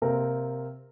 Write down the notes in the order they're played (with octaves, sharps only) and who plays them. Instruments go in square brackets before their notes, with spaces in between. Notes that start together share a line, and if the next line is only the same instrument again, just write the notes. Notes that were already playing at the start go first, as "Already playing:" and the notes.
[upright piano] C3 A#3 C4 A#4